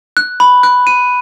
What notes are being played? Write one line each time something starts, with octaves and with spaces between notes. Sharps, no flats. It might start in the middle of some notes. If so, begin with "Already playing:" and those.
F#6
B5
F#6
D#7